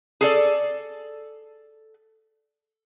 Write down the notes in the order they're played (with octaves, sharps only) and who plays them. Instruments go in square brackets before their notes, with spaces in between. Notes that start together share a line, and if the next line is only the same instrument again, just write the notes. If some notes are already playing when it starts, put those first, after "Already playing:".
[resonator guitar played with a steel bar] G#4 A4 D5